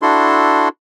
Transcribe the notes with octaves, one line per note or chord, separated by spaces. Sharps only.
D4 E4 F#4 A4 C6